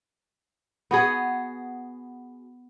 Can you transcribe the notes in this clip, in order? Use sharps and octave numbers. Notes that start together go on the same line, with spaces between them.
B3 F#4 G#4